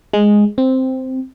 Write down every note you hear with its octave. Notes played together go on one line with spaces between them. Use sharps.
G#3
C4